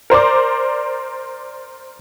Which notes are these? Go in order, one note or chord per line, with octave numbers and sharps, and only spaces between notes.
A#4 C5 D5 D6